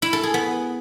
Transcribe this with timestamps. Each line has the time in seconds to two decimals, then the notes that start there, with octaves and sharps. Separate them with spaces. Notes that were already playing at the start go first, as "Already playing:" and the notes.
0.02 E4
0.13 A4
0.23 G#4
0.34 B3